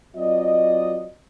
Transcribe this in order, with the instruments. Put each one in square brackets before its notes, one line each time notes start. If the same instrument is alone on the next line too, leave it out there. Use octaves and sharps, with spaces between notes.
[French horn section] F#3 C4 F4 D5 D#5